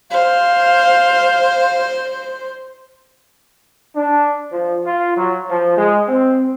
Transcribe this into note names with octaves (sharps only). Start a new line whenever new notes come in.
C5 F5
D4
F3
F4
F#3
F3
G#3
C4